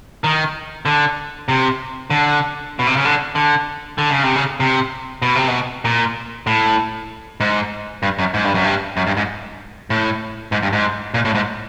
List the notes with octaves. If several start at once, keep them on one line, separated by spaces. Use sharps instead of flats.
D#3
D3
C3
D3
B2
C3
C#3
D3
D3
D3
C#3
C3
C#3
C3
B2
C3
B2
A#2
A2
G#2
G2
F#2
G#2
G2
F#2
G2
F#2
G2
G#2
A2
G#2
G2
G#2
A#2
A2
G#2